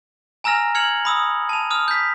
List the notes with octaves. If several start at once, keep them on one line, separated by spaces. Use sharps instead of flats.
G#5 A#5 E6 F6 A#6 F7
F6 G#6 C#7 F7 F#7
B5 D#6 E6
A5 F7
D#6 F6 F7
G6 B6